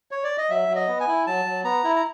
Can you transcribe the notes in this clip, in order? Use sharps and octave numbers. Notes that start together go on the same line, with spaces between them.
C#5
D5
D#5
F#3 E5
F#3
D#5
B3
G#5
E4
F#3 A5
F#3
B3 A#5
E4
A#5